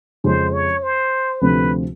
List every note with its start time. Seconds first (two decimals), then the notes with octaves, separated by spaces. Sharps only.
0.24 F2 C#3 F3 G#3 C#4 C5
0.53 C#5
0.83 C5
1.41 D2 C3 F3 A3 C4 B4